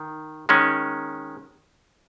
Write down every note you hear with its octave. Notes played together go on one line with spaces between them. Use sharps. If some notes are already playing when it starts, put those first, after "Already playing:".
Already playing: D#3
D#3 G#3 C#4